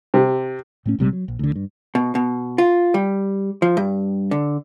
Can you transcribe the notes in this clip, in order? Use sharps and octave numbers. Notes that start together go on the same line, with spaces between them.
C3
A2 A3 C#4
A#1 C3 G3 G#3
F#3
A#1
D2 D3
G2
B2
B2
F4
G3
F3
G2
D3